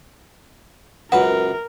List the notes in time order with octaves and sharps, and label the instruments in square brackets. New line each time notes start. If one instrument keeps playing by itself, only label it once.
[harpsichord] C#2 F#2 B4 [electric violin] A#4 [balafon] F#5